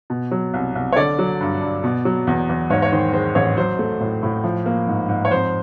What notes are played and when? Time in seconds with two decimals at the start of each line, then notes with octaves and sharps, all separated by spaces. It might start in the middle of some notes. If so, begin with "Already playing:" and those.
0.10 B2
0.31 F#3
0.54 C2
0.75 C2
0.92 C#5
0.96 D3 D5
1.19 F#3
1.40 G2
1.62 G2
1.84 B2
2.05 F#3
2.27 E2
2.49 E2
2.70 G#2 C#5
2.82 C#5
2.92 D#3 C5
3.13 G#3 C5
3.35 A1 C#5
3.57 F#3 C5
3.79 A3
4.00 A2
4.23 A2
4.44 F3
4.66 A#3
4.87 G#2
5.09 G#2
5.25 C#5
5.31 F2 C5